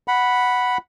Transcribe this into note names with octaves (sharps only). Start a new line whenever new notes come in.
F#5 B5